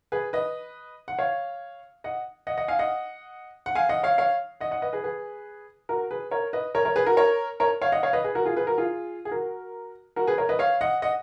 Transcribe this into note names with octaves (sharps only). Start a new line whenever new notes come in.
G#4 B4
B4 D#5
F#5
C#5 F5
D#5 F#5
D#5 F#5
D#5 F#5
F5 G#5
D#5 F#5
F#5
F5 G#5
D#5 F#5
C#5 F5
C#5 F5
D#5 F#5
D#5 F#5
B4 D#5
G#4 B4
G#4 B4
F#4 A#4
G#4 B4
A#4 C#5
B4 D#5
A#4 C#5
A#4 C#5
G#4 B4
F#4 A#4
A#4 C#5
A#4 C#5
C#5 F5
D#5 F#5
C#5 F5
B4 D#5
G#4 B4
F#4 A#4
F4 G#4
G#4 B4
F#4 A#4
F4 G#4
G#4
F#4 A#4
F#4 A#4
G#4 B4
A#4 C#5
B4 D#5
C#5 F5
D#5 F#5
D#5 F#5